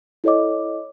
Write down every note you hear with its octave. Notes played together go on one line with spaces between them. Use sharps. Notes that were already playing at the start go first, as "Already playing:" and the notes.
E4 A4 C#5 D#5 D6